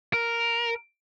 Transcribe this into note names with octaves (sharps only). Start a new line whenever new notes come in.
A#4